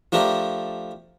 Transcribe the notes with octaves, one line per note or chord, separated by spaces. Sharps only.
F3 A3 D4 G4 A#4